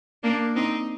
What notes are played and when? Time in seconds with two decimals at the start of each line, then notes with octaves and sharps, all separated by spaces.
0.23 A#3 D4
0.56 C4 D#4